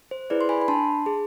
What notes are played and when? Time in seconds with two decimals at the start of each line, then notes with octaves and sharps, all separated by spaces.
0.11 C5
0.30 E4 G#4 B4 D5
0.41 C6
0.49 G#5 B5
0.62 B5
0.68 D4 A5 C6
1.06 G#4